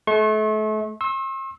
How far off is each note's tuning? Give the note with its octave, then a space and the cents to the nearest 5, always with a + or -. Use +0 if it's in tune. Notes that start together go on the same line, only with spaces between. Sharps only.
A3 -35 C#6 -40
C6 +45 E6 -15